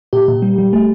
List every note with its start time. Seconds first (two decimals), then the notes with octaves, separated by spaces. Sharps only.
0.13 A#2 G4
0.28 A#2
0.42 G3
0.58 G3
0.73 A3